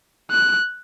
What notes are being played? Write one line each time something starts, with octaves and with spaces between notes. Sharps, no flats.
F#6